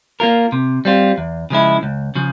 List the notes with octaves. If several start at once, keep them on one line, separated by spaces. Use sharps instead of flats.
A#3 F4 A#4
C3
G3 C4 F4
E2
C#3 F3 G#3 E4
C#2
C#3 F3